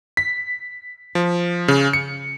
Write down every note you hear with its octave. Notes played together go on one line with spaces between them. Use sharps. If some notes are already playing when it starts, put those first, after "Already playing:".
B6
F3
C#3
C#7